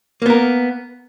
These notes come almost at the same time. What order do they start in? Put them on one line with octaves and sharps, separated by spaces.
A#3 B3 A#4